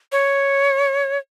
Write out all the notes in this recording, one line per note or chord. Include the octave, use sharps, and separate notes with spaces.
C#5